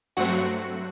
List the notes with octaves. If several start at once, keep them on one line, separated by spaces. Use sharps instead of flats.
G2 F#3 A3 C4 F#4 F#5